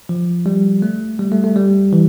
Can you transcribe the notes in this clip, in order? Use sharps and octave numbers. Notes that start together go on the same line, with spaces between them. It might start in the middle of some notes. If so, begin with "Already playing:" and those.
F3
G3
A3
G3
A3
A3
G3
E3